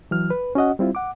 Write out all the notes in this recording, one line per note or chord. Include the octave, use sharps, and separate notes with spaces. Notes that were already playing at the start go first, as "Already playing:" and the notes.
E3 F#3 F6
B4
C#4 F#4 D#5 F#5
G3 C4 E4 F4
F#5 D6